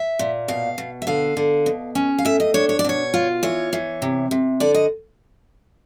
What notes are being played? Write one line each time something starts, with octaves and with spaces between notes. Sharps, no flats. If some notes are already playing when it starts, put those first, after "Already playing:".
Already playing: E5
A#2
B2 F5
B2
E5
D3 F5
D3
B2
C#4
F5
A2 E5
D#5
D4 C#5
C#5
D5
B2 C#5
F4
E3 C#5
E3
C3
C3
D3 D5
D#5